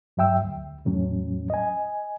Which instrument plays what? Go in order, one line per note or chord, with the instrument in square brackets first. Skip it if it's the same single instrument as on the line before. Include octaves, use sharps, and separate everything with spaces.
[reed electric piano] G2 F#3 E5 G5 E6
D2
E2 A2 F#3 C#4
D#5 G#5